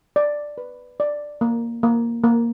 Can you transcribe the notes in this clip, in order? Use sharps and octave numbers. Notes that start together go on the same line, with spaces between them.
D5
B4
D5
A#3
A#3
A#3